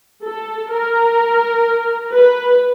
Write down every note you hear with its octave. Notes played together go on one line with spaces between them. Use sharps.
A4
A#4
B4